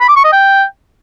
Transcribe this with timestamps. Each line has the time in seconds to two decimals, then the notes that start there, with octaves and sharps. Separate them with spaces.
0.01 B5
0.08 D6
0.16 C#6
0.24 D#5
0.32 G5